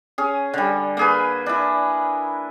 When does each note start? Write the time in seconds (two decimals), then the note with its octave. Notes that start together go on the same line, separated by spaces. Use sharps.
0.18 C#4 G#4
0.54 D3 G3
0.97 A#3 G#4 B4
1.46 D4 E4